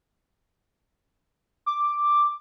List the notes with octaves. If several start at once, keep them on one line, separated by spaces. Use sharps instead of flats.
D6